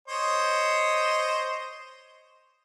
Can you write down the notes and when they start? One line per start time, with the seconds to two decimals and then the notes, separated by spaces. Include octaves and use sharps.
0.08 C5 C#5 D#5